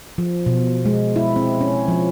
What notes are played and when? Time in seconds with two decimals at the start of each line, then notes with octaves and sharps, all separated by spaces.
0.18 F3
0.46 B2
0.86 G#3
1.16 E4
1.36 C4
1.61 C#4
1.88 F3